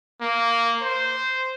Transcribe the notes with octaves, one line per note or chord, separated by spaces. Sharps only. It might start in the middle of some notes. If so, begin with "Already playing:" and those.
A#3
C5